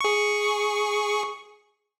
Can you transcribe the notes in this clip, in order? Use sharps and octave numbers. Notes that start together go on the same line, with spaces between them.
G#4 C#6